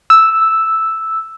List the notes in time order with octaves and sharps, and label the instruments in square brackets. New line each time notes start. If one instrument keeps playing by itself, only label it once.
[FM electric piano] E6